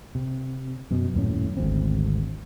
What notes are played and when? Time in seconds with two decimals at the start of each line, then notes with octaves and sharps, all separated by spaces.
0.15 C3
0.91 F#2 B2
1.14 D#1 F#2 A2 C#4
1.57 G#1 D2 C4